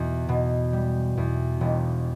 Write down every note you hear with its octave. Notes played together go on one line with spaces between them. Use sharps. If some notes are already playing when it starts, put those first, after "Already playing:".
Already playing: E2 B2
B2
G3
E2
E1